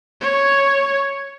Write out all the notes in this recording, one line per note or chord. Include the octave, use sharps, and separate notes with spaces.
C#5